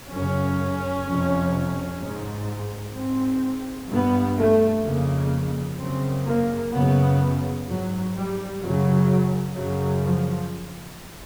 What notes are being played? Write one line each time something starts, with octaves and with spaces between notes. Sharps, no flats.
F#2 C#3 C#4
F2 C3
G#2
G#2 C4
G2 B3
A3
F2 C#3 A#3
F#2 C#3 C4
A#3
F#2 C#3 B3
G#2 F#3
G3
F#2 C#3 F#3
F#2 C#3 F#3
F3